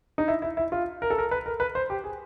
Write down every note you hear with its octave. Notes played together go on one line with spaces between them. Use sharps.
D#4
E4
E4
E4
F4
A#4
A4
A#4
B4
A#4
B4
C5
G4
G#4